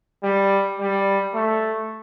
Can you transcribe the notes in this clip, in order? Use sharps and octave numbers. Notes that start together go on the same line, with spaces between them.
G3
G3
A3